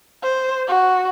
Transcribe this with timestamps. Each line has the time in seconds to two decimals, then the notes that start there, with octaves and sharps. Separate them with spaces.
0.23 C5
0.68 F#4